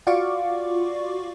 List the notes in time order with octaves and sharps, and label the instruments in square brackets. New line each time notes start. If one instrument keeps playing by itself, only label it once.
[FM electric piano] F4 F#4 D5 F5 C#6 D6